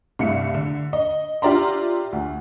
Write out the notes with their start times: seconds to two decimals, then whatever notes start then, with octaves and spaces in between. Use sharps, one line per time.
0.19 C2 G2 A3 E4 C#7
0.54 D3
0.93 D#5
1.42 F4 G4 D5 E5 A#5 C6
2.13 D2